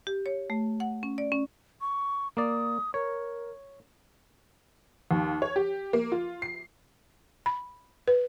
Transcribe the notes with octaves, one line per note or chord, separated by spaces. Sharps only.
G4
C#5
A3
F#5
C#4
D5
C#4
C#6
A#3 D5 D#6
A#4 C#5
D#2
C#5
G4
A#3
F4
C7
B5
B4